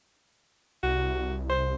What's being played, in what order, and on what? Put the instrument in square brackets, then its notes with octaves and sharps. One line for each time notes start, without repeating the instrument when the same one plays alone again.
[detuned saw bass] C2 [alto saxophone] F#4
[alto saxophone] C5